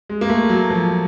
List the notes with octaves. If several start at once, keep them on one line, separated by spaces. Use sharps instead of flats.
G#3
A#3
A3
F#3
F3